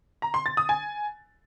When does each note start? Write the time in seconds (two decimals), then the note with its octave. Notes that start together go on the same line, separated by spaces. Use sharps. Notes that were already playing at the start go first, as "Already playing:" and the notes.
0.22 A#5
0.34 C6
0.46 A6
0.57 D#6
0.69 G#5